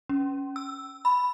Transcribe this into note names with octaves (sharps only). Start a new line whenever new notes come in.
C#4
E6
B5